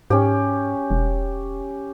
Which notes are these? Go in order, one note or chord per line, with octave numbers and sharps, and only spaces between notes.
G#2 C#4 G4
E1